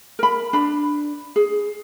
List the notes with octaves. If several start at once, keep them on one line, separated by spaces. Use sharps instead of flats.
A#4 B5
D4 B5
G#4